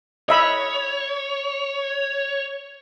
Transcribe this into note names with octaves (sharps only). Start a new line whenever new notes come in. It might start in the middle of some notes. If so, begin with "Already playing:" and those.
C#5 D#5 E5 B5